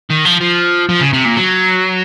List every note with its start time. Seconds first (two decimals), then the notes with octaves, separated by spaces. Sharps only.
0.10 D#3
0.25 F3
0.41 F3
0.89 F3
1.01 C#3
1.13 C3
1.25 A#2
1.37 F#3